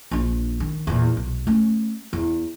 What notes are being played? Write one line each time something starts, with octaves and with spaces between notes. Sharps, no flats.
A#1 D4
D#3
E2 A#2
B1
A3 C#4
E2